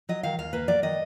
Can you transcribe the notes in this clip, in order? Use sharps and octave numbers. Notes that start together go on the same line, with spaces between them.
F#3 D#5
D#3 F5
D#2 F5
A#3 B4
F#3 D5
D#3 D#5